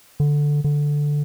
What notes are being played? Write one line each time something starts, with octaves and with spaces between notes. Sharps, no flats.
D3
D3